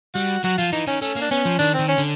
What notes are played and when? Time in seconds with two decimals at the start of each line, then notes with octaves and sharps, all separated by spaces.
0.15 G3 F#4
0.44 F#3 F#4
0.58 F3 F4
0.73 E3 D#4
0.87 D#3 C#4
1.02 A3 C#4
1.16 A#3
1.22 D4
1.31 B3 C#4
1.45 F3
1.59 D#3 D4
1.74 D#3 C4
1.88 C#4
1.98 D3